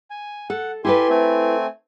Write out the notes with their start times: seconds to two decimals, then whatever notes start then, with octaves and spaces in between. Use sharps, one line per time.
0.10 G#5
0.50 A4 F#5
0.85 E4 G4 A4 B4 G#5 C6
1.09 A3 C4 G#5